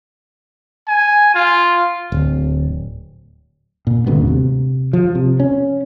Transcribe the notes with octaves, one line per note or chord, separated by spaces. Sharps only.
G#5
F4
D1
A#2
D#1 G#1 D2 B3
C3
F3
C3
C#4